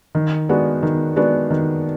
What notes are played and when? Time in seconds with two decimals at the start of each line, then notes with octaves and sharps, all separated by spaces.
0.15 D#3
0.49 G#3 B3 D4 F#4
0.83 D#3
1.16 G#3 B3 D4 F#4
1.50 D#3